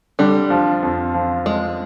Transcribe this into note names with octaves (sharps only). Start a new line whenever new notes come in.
D3 G3
F3
F2
F3
F3 G#3